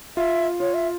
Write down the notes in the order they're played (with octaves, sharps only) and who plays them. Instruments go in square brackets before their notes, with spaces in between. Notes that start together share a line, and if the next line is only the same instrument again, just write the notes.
[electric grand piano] F4 [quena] E5
[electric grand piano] F4 [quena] C#5
[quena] E5